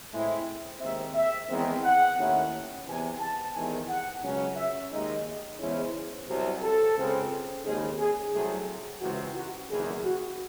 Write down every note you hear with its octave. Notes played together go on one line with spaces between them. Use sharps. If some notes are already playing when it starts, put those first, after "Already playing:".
A2 G#3 C4 E4
D#2 D#3 G#3 C4 E5
E5
E2 D#3 G#3 C4
F#5
D#2 D#3 A3 C#4 E4
E2 C3 E3 G#5
A5
E2 C3 D#3 G#3 G#5
F#5
C#2 C#3 F#3 C#4
E5
D#2 D#3 G#3 D#4 D#5
E2 C#3 G#3 C#4 E4 C5
C2 C3 F#3
A4
C#2 C#3 G#3 C4
D#2 C#3 G#3 C4 D#4 G#4
G#4
C2 C3 F#3 A3 G#4
C#2 C3 E3 G#3 F#4
F#4
F#1 E2 D#3 G#4
F#4